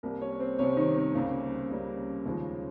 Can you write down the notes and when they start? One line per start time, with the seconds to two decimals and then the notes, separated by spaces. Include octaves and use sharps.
0.03 C2 C3 G3 A#3 A#4
0.21 C#4 C#5
0.40 C4 C5
0.58 C2 C3 G3 C#4 C#5
0.77 D#3 D#4
0.96 C4
1.15 C#2 C#3 G3 A#3
1.70 C#2 C#3 G3 A#3
2.25 D#2 C#3 F3 G#3 C#4